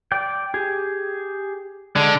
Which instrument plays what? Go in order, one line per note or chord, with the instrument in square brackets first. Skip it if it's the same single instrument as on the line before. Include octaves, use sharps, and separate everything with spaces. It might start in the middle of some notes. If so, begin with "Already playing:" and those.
[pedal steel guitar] D5 G5
G4 G#4
[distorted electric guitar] D3 [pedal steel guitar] G#3